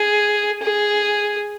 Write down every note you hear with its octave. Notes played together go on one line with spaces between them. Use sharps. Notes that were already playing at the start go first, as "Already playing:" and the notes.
Already playing: G#4
G#4